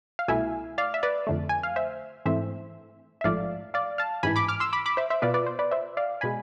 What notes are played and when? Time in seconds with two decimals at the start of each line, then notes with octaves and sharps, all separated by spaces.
0.19 F5
0.28 C2 B2 A3 E4 E5 G#5
0.78 D5 F5
0.94 E5
1.03 B4 D5
1.27 F2 D3 A3
1.49 G#5
1.63 F5
1.76 C5 E5
2.26 G#2 E3 A3 C4 C5 E5
3.21 E5
3.24 A1 G#2 F3 A3 D5 F5
3.74 D5 F5
3.98 F5 A5
4.23 A1 G#2 E3 G#5 B5
4.36 B5 D6
4.48 D6 F6
4.60 C6 E6
4.73 B5 D6
4.86 B5 D6
4.97 C5 E5
5.10 C5 E5
5.22 B2 B3 F4 B4 D5
5.34 B4 D5
5.46 C5
5.59 B4 D5
5.71 C5 E5
5.97 D5 F5
6.21 B2 G#3 G#5 B5